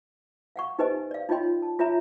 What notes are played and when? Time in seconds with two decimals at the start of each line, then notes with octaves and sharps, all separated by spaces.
0.56 F5 F#5 C#6
0.79 D#4 G4 B4 C5 D#5 G#5
1.11 D5 F5
1.29 D#4 F4 C#5 D#5 G5 C6
1.62 A5
1.79 F4 C#5 E5 G#5 A#5